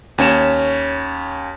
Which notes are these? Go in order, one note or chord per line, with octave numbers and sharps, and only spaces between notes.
D#2 C#4 C#5 E7